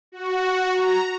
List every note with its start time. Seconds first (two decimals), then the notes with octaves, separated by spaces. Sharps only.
0.12 F#4
0.74 A#5